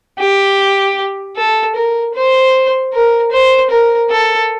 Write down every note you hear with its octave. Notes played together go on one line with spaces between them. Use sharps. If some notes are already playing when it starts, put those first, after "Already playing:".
G4
A4
A#4
C5
A#4
C5
A#4
A4